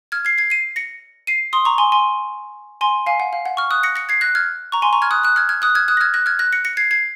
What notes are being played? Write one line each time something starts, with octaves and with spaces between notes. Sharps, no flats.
F6 G#6
G#6 C7
G#6 C7
C7 D#7
A#6 C#7
C7 D#7
C6 D#6
A#5 C#6
G#5 C6
G#5 C6
G#5 C6
F5 G#5
F#5
F5
F#5
C#6 F6
D#6 F#6
A#6 C#7
A#6 C#7
G#6 C7
F#6 A#6
F6 G#6
A#5 C#6
G#5 C6
A#5 C#6
F6 G#6
D#6 F#6
D#6 F#6
F6 G#6
F6 G#6
D#6 F#6
F6 G#6
D#6 F#6
A#6
F6 G#6
F#6 A#6
F6 G#6
F#6 A#6
A#6 C#7
A#6 C#7
G#6 C7
G#6 C7